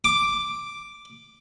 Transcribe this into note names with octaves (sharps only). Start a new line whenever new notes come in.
D6